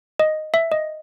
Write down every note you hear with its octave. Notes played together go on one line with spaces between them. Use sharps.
D#5
E5
D#5